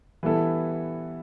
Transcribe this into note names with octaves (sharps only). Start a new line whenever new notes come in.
E3 G3 B3 E4 A4